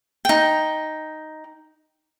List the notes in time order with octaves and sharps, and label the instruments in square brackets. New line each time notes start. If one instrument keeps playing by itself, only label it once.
[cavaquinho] D#4 G5